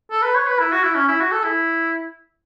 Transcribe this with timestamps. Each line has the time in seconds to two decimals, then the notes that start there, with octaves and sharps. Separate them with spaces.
0.11 A4
0.22 B4
0.35 C#5
0.47 B4
0.59 E4
0.72 F#4
0.83 E4
0.95 C#4
1.08 E4
1.20 F#4
1.32 A4
1.44 E4